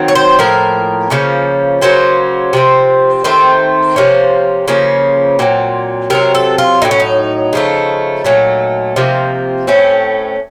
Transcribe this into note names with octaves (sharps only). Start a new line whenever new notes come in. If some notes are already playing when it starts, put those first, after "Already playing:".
Already playing: D#3 F#3 C4
C#5
C5
A2 F3 A#3 A#4
C#3 F3 A#3 C#4
C#3 F#3 A#3 C#4 C5
C3 F3 C4
D#3 A3 C4 C5
C3 F3 A#3 C#4
C#3 F3 A#3 C#4
A#2 F#3 C4
C3 F#3 C4 A#4
A4
F4
A2 F#3 C4 D#4
C#4
D#4
C#3 F3 A3
A#2 F#3 A3
C3 F3 A#3
A2 A3 C4 C#4